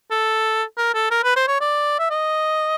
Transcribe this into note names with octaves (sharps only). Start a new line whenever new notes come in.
A4
A#4
A4
A#4
B4
C5
C#5
D5
E5
D#5